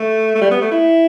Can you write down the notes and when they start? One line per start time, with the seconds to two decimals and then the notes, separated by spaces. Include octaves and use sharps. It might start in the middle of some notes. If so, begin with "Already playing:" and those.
Already playing: A3
0.35 A3
0.41 G3
0.52 B3
0.61 A3
0.72 E4